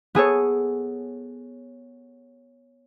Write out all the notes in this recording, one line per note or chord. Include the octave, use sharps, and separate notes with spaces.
B3 G#4 A4 C#5